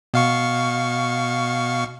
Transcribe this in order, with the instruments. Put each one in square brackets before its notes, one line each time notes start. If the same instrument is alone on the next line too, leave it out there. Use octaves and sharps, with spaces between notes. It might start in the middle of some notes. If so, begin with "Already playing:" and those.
[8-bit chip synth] B2 F5 C#6